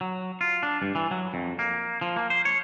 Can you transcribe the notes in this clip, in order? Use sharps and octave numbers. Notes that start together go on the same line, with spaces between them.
F#3
F4
D4
G2
E3
F#3
F2
A#3
F3
A#3
C5
C#5